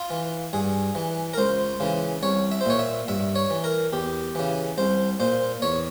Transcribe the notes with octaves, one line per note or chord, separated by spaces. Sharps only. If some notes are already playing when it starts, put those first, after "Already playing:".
Already playing: F4
E3
G2 G#4
E3
A#4
C#2 C5
C#3 E3
C2 C#5
E5
C5
A#2 C#5
E5
G2 E5
C#5
E3
A#4
E2 G4
C#3 E3
C2 C5
A#2 C5
E2 C#5